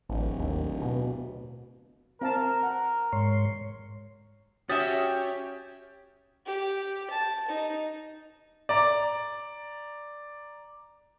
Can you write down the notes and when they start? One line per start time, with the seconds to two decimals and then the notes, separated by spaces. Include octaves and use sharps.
0.10 D1 A1
0.40 D#2
0.82 B2
2.21 C4 A#4 F5 A5
2.63 F#5
3.13 G#2 C#5 C6
4.69 C#4 F#4 G4 E5 D#6 A6
6.47 G4
7.11 A5
7.49 D#4
8.69 D5 A#5 D6